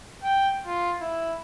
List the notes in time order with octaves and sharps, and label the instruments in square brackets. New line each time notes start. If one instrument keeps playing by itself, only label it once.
[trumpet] G5
F4
E4